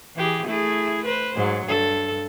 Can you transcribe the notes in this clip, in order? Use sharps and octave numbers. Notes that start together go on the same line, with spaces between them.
E3 G4 G#4
A3 E4 G#4
B4 C5
G#2 F#3
G2 A4